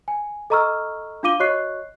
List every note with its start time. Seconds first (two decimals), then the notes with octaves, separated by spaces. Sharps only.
0.08 G#5
0.50 A4 D#5 A#5 C#6 E6 F6
1.23 D4 F4 F5 D6 D#7 G7
1.40 F#4 C#5 D#5 C#6 F#6 C7